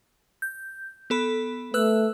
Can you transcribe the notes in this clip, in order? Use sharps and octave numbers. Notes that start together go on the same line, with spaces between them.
G6
B3 A4 B5
A3 B4 E6 F#6